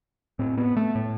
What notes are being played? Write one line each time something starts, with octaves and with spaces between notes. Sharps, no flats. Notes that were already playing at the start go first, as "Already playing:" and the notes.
A2 C4
B3
A3
A2